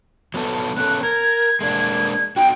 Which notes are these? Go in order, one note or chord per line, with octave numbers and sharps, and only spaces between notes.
F#3 B3 A4
B3 C#4 A4 F#6
A#4 G#6
G#3 A#3 D4
D#4 F#4 G5